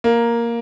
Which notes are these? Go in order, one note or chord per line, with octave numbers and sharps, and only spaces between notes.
A#3